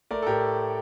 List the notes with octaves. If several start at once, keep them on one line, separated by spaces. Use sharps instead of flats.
A3 A#4 D5
A4
A2 G4 A#4